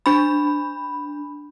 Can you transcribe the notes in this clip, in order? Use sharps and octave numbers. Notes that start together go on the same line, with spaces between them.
D4 B5